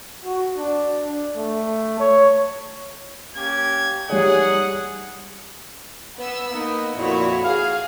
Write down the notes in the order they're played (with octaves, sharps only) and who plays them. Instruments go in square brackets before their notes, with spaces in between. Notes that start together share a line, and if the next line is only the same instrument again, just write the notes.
[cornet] F#4
D4
A3
C#5
[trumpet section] A#3 C#4 G4 [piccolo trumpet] G#6
[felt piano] G3 C#5 [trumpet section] D#4 G#4 [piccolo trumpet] F#5
[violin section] B3 E6
[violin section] A#3 [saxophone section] B3 D#4
[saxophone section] F2 A#2 [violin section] E4 F#4 C#5
[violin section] G#4 [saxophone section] F5